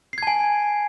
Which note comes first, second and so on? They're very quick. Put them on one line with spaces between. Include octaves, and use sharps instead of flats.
C7 G#6 A5 G#5